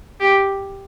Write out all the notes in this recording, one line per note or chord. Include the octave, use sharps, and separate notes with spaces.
G4